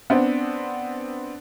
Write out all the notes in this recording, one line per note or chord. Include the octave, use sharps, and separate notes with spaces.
B3 C4 D4